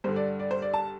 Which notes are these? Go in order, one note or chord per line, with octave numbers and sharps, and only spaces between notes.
G2 D3 C5
D5
D5
C5
D5
A5